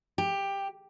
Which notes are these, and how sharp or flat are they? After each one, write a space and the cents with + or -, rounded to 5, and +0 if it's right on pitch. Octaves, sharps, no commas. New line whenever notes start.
G4 +10